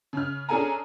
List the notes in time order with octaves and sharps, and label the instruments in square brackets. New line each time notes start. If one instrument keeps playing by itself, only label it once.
[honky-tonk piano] C#3 F6
C#4 D4 G#4 A4 G#5 A#5